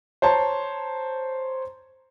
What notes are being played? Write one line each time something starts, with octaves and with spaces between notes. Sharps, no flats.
C5 C#5 A5 A#5 C6